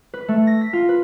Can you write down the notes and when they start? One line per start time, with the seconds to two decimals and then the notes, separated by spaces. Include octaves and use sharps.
0.14 B4
0.28 A3
0.47 A#6
0.61 B6
0.73 F4
0.89 B4